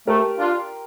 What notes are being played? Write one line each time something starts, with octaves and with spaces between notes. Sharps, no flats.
A3 G4 A#4
D4 F4